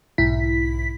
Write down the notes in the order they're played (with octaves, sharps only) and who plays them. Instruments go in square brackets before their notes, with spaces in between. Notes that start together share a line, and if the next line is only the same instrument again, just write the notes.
[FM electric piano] B1 G#2 E4 B6